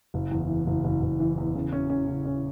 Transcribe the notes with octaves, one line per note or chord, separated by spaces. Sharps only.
F#1
E2
E3
F#1
F#1
F#1
E3
E2
C#3
C#4
C#4
C#3
C#4